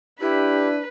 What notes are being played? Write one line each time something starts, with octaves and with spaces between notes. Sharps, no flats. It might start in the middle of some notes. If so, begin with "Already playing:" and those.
D4 E4 G4 B4